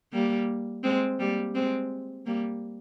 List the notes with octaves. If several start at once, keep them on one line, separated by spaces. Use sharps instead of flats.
G3 A#3
G#3 C4
G3 A#3
G#3 C4
G3 A#3